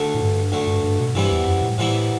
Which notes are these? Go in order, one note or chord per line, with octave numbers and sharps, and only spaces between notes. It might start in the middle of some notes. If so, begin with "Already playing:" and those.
Already playing: D2 D3 A3
A2
G2
D2 D3 A3
G2
G2
B2
G2 C3 E3 G3 B3 E4
E2
F#2
A2
A2 C3 E3 G3 B3 E4